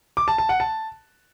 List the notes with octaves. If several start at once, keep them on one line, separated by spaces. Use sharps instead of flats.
D6
A5
A5
F#5
A5